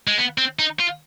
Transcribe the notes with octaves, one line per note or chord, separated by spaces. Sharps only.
G#3
B3
C4
D#4
F4